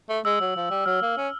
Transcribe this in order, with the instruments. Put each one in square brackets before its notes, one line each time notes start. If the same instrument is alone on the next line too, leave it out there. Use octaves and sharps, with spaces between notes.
[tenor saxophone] A3
[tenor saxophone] G#3 [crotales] E6
[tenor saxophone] F#3
F3
G3
[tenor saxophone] F#3 [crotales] F6
[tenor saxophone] A#3
C#4